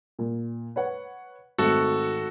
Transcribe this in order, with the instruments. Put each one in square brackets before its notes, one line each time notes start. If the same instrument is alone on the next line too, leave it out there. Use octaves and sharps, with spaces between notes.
[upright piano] A#2
B4 C#5 F#5
[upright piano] G#1 A3 C4 [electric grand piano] F#4 A4 F#5